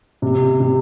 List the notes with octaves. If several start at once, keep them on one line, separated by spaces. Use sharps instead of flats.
C3
C3